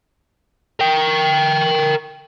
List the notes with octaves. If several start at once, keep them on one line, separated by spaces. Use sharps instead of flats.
A#4 G5